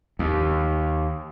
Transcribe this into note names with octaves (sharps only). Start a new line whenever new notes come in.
D#2